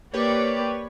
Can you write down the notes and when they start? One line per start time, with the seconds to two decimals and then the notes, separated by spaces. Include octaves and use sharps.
0.14 A#3 G4 B4 C#5 D5